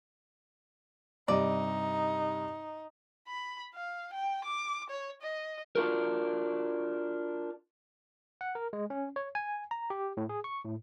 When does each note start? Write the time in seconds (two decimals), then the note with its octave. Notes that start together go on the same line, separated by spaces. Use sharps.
1.28 G2 C3 D#4 D5 D#5
3.28 B5
3.75 F5
4.13 G5
4.45 D6
4.90 C#5
5.22 D#5
5.75 D4 F4 F#4 A#4
8.41 F#5
8.55 A#4
8.73 G#3
8.90 C#4
9.16 C#5
9.35 G#5
9.71 A#5
9.90 G4
10.17 A2
10.29 G#4
10.44 C#6
10.64 A2